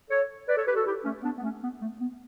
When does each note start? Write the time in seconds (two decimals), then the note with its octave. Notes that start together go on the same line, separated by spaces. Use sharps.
0.09 A4 C#5
0.48 B4 D5
0.56 A4 C#5
0.66 G4 B4
0.76 F#4 A4
0.85 E4 G4
1.04 A3 C#4
1.23 B3 D4
1.37 B3
1.43 A3 C#4
1.62 B3
1.81 A3
2.00 B3